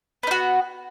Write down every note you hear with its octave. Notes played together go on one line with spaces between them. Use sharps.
B3 D#4 F#4